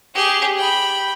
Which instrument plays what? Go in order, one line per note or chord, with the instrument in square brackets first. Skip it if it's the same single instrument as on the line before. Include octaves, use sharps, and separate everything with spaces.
[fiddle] G4 G#4
G5 B5